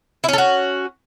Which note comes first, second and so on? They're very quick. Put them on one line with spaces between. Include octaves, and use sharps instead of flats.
E4 C#4 A4 F#4